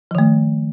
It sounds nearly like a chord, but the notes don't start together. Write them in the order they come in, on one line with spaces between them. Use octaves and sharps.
F3 D#3 A3